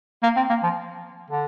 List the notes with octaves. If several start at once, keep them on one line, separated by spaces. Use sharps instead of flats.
A#3
C4
A#3
F3
D3